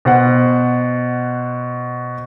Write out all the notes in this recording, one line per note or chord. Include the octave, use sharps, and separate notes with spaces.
B2 C5 F#5